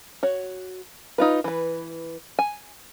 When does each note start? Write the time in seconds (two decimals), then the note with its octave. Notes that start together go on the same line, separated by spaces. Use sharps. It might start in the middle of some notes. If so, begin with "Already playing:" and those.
0.23 F#4 C#5
1.18 D#4 F4 B4
1.44 E3 B4
2.39 G#5